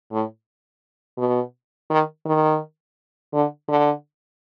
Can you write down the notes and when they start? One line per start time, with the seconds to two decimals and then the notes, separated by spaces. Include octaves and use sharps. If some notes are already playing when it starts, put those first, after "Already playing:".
0.12 A2
1.18 B2
1.90 D#3
2.25 D#3
3.33 D3
3.69 D3